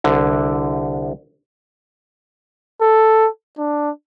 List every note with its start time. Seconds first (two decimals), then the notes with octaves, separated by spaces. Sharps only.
0.04 C2 D3
2.82 A4
3.58 D4